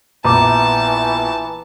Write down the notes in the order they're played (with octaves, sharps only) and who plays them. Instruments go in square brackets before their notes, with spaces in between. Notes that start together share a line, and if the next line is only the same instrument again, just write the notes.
[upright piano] A#1 B3 [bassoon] E3 [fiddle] A5 [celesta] A#5 D6